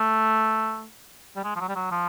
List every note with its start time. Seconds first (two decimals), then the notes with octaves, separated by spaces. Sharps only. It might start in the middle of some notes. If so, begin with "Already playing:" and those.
Already playing: A3
1.36 G3
1.44 G#3
1.56 F3
1.61 F#3
1.69 G3
1.75 F#3
1.91 F3